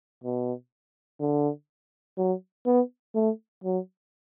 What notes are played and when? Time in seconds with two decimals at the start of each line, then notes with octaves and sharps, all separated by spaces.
0.24 B2
1.20 D3
2.18 F#3
2.66 B3
3.15 A3
3.64 F#3